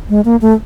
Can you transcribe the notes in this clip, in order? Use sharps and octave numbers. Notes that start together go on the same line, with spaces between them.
G#3
A#3
A3